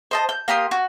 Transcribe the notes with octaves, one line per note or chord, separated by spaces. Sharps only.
C5 D#5 A5
G6
A#3 G4 C6 D#6
F#4